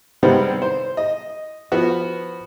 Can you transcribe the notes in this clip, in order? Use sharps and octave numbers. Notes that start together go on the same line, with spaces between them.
C3 D#3 G3 G#3 B3 C4
C5
D#5
F3 B3 F#4